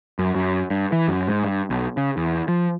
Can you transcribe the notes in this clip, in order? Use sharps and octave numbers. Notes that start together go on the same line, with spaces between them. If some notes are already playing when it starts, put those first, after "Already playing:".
F#2
F#2
G2
E3
F#2
G#2
G2
B1
C#3
E2
F3